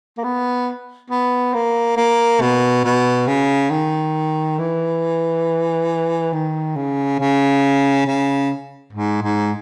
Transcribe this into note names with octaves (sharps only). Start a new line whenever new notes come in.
A#3
B3
B3
A#3
A#3
B2
B2
C#3
D#3
E3
D#3
C#3
C#3
C#3
G#2
G#2